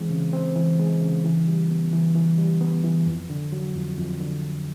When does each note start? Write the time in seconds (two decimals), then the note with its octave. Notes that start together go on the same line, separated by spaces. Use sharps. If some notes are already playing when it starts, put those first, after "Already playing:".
Already playing: E3 G#3 C4
0.10 C#3
0.33 C4
0.56 E3
0.79 G#3
1.01 C#3
1.24 E3
1.47 G3
1.70 B3
1.93 E3
2.15 E3
2.38 G3
2.61 B3
2.84 E3
3.06 F2
3.30 D3
3.52 F#3
3.75 F2
3.98 F2
4.20 D3